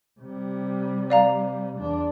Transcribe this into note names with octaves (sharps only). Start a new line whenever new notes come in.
C3 G3
D5 F5 A#5
E2 D4